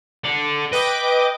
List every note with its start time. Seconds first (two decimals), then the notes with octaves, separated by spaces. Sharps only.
0.24 A4 D5
0.72 B4 D#5 G5 D6